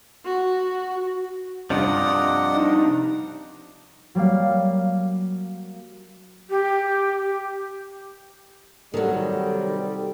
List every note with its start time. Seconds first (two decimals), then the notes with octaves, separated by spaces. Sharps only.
0.24 F#4
1.70 G2 C3 F3 D5 D#5 F#5
2.52 D4 D#4
4.15 F#3 G3 A#3 F5
6.50 G4
8.94 C3 D#3 F#3 G3 A4